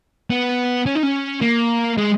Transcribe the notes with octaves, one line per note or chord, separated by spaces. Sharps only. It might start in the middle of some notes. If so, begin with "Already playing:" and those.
B3
C#4
D#4
C#4
A#3
G#3